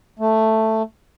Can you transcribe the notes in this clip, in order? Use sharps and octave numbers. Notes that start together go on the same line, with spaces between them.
A3